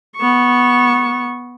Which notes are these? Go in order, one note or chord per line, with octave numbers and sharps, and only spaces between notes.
B3 C#6